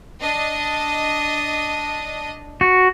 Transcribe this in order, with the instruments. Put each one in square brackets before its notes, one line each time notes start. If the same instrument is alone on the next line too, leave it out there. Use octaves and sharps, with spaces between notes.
[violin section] D4 D#5
[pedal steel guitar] F#4